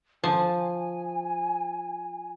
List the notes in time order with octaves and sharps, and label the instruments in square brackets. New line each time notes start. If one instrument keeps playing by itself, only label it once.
[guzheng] F3 [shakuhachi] G#5